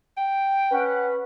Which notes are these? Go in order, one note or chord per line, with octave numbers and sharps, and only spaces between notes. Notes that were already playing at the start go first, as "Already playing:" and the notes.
G5
C#4 B4 F#5